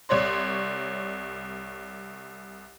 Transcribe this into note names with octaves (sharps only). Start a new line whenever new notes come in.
C2 C#5 D5 C6